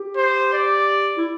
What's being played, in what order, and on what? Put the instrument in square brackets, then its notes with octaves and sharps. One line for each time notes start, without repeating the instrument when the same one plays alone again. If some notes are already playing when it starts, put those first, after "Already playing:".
Already playing: [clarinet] G4
[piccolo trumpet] C5
D5
[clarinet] E4